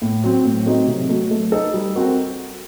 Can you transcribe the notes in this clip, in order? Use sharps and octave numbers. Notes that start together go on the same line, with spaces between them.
A2
F#3 C4
A2
F#3 A3 C4 D#4
C3
F#3 A3
A3
D#4 A4
G3
C4 F#4 A#4